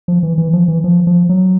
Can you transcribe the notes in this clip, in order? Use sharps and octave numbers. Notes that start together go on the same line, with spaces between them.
F3
E3
E3
F3
E3
F3
F3
F#3